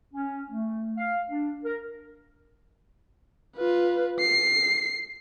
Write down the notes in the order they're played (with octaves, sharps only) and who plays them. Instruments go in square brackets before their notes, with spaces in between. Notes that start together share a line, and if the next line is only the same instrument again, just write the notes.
[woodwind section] C#4
A3
F5
D4
A#4
[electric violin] F4 B4
C7